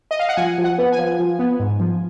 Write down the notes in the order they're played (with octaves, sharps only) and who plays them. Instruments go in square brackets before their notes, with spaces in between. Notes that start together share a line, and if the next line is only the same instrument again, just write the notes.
[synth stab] D#5
F5
F#5
F3 G#5
F3
F#5
B3
G#5
F3
F3
B3
G#2
F3